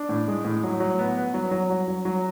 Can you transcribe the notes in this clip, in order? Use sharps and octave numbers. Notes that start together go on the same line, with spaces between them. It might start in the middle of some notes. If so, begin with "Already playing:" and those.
Already playing: D4
A2
G#3
A2
F#3
F#3
B3
B3
F#3
F#3
F#3
F#3
F#3